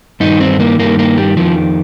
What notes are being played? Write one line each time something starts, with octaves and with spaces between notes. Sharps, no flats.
G2 D#3 D#4
C4
A#3
G2 D#3 A#3
A#3
G3
F2 D#3 F3